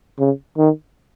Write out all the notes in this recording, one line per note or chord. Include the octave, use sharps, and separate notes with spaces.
C#3
D#3